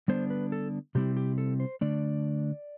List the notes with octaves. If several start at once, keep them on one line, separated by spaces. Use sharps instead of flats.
D3 G3 B3 D4 C5
B4
A4
C3 G3 C4 E4 G4
G4
A4
C5
D3 A3 D4 D5